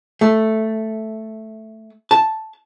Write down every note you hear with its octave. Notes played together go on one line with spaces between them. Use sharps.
A3
A5